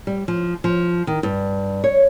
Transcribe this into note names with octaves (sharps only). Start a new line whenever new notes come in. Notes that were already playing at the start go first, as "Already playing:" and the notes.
G3
F3
F3
D#3
G2
C#5